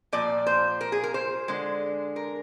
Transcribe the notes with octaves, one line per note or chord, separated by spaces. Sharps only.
A#2 F3 D5
C5
A#4
G#4
A#4
C5
D3 G#3
A#4